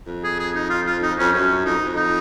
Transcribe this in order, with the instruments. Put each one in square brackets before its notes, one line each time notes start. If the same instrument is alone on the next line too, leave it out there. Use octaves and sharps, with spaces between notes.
[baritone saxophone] F2
[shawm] G#4
G#4
D#4
F4
F4
D#4
[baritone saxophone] F2 [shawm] C#4
[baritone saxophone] F#2 [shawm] C#4
[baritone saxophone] F2 [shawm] D#4
[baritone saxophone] F2
[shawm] D#4